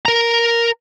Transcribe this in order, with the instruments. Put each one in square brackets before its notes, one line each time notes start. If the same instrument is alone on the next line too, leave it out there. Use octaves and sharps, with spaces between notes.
[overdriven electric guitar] A#4 A#5